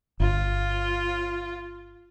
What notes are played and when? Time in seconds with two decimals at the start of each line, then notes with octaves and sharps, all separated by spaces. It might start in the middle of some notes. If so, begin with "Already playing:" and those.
0.20 G1 F4